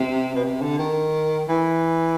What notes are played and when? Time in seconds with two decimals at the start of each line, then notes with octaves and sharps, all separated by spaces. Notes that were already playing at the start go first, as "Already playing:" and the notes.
Already playing: C3
0.35 B2
0.44 C3
0.62 D3
0.79 D#3
1.48 E3